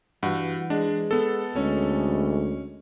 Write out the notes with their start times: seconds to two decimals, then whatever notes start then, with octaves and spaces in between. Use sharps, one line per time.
0.23 G2 E3 F#4
0.70 G#3 D4
1.11 B3 A4
1.55 D2 G#3 C#4